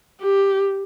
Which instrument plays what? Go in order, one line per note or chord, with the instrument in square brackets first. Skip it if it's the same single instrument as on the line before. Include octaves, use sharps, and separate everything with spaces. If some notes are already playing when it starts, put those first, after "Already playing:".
[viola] G4